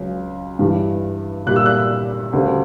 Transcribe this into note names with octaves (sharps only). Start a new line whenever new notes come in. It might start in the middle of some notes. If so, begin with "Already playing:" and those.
Already playing: C#2 C#3 F#3
G2 E3 G3
A#2 G3 F#6
E6
F#6
D2 C#3 G3